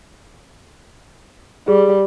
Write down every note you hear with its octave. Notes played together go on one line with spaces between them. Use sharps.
G3 G#4